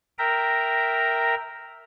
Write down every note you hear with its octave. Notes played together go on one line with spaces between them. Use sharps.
A#4 E5 G5 A#5